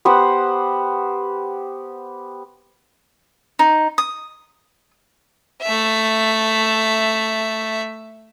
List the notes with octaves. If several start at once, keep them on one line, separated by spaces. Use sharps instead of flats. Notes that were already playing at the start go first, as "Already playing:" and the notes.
B3 G4 C5 F#5
D#4
D#6
A3 E5